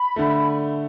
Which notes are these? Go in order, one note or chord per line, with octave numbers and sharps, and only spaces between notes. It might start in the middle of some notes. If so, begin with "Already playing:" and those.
Already playing: B5
D3 A3